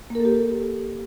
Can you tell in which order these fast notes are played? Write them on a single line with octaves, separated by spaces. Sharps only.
A#3 A#4 A4 G4